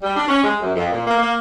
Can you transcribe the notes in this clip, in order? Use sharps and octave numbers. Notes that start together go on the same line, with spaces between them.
G3
D4
C#4
G#3
F#2
F2
A#2
A#3
A#3